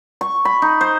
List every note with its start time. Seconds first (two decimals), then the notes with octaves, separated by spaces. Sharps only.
0.21 C#6
0.45 B5
0.62 D#4
0.81 C5